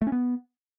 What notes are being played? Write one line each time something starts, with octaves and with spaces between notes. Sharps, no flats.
A3
C#4
B3